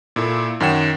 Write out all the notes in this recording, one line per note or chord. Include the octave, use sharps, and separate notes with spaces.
A#2 E4 A4
F#2 D#3 C#5 F#5 G5 E7